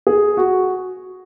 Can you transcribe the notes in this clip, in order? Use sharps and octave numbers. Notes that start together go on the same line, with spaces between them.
G#4
F#4